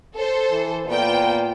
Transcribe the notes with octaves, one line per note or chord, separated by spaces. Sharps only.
A4 C5
E3
A#2 B3 G5